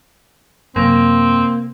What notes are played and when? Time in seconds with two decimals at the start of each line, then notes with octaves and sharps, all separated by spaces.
0.76 F#2 C3 A#3 C4